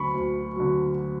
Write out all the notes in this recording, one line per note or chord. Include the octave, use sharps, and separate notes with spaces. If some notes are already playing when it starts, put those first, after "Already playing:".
Already playing: D2 D3 F#3 B5 C#6
D2
D3 F#3